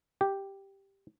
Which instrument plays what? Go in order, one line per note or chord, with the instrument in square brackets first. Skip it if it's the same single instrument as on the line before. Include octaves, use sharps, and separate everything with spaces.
[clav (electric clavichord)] G4